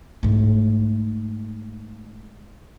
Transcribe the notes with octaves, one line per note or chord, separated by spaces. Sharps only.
G#2 A3